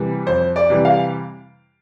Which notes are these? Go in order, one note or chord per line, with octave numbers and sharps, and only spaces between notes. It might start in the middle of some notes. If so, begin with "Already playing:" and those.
Already playing: C3 E3 G3
F2 C5
D5
C3 E3 G3
F5